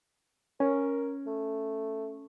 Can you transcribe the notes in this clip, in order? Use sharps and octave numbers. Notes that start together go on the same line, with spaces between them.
C#4 A#4
A3